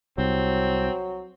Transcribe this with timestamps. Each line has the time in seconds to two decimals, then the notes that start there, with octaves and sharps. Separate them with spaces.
0.18 C2 F#3 C4